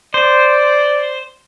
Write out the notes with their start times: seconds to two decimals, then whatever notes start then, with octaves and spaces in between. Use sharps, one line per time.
0.14 C5 D5